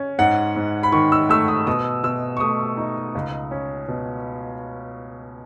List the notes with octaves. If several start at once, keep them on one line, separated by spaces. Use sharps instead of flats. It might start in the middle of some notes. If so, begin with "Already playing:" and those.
Already playing: C#4
G#2 F#5
G#2
B5
D#3 C#6
E6
A3 E6
D#6
B2 D#6
B2 E6
C#6
A3 D#6
D#4
C#2
C#4
B2